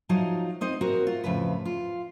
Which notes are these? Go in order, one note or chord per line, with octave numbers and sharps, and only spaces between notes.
F3 F#3 D#4 F4
C4 D#4 C5 D#5
C4 F#4 A#4
F4
F2 A2 C#3 B4
F4